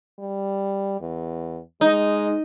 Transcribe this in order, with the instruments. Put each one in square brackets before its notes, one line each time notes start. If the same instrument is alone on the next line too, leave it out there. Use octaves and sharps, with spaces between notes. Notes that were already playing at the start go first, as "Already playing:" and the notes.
[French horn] G3
E2
[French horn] G#3 [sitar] D#4